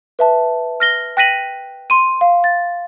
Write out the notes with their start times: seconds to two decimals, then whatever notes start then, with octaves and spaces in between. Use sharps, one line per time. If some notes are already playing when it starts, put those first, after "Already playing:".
0.19 B4 E5 A5
0.80 F6 A#6 G7
1.17 G5 F#6 A#6 B6 D#7 F#7
1.90 C6 D#7
2.21 F5
2.44 A6